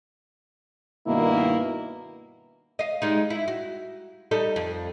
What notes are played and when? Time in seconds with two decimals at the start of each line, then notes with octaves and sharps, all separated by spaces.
1.07 G2 B2 D#3 A#3 B3 E4
2.79 D#5 F5
3.02 G3 G#3 D#4
3.30 E4
3.48 F#4
4.31 G3 D#4 A4
4.56 F2